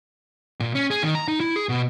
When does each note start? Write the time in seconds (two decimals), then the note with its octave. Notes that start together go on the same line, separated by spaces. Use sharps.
0.60 A#2
0.75 C#4
0.91 G#4
1.03 D#3
1.15 A#5
1.28 D#4
1.40 E4
1.56 G#4
1.69 B2